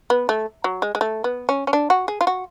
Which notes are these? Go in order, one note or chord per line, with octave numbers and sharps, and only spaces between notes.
B3
A3
F#3
G#3
G#3
A3
B3
C#4
C#4
D4
F#4
G#4
F4
F#4